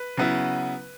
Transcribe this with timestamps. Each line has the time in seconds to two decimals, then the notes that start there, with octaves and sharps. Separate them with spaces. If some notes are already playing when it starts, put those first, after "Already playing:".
Already playing: B4
0.17 C#3 F#3 B3 E4